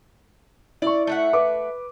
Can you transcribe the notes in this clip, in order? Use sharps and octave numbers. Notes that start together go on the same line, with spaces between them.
E4 D5 C#6
A3 E5 F#5
B4 D6